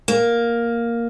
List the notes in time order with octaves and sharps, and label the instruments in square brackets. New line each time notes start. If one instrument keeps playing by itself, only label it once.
[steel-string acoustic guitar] A#3